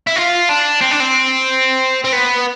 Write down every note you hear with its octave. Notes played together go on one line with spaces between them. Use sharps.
E4
F4
D4
C4
D4
C4
C4
B3